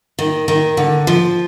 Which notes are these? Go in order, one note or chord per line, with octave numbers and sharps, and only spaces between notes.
D#3
D#3
D3
F3